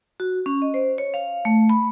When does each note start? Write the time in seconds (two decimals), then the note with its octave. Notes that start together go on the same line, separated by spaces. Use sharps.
0.20 F#4
0.46 C#4
0.62 D#5
0.74 C5
0.98 C#5
1.14 F5
1.45 A3
1.70 B5